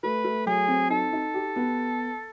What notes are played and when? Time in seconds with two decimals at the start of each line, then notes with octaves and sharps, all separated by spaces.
0.03 A3 B4
0.24 A3
0.46 F#3 G#4
0.68 C4
0.90 D#4 A4
1.13 D#4
1.34 G4
1.56 B3